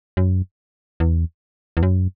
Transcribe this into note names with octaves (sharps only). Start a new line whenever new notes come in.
F#2
E2
E2
F#2